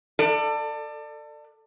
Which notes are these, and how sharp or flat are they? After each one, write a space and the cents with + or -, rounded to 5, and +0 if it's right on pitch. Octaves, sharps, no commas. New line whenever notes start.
A4 +25 D5 +25